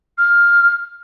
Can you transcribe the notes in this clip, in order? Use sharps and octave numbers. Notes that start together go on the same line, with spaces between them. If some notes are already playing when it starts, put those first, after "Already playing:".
F6